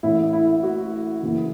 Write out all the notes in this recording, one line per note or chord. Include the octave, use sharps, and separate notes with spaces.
A1 A2 E3 E4
E4
F#4
F#1 F#2 E3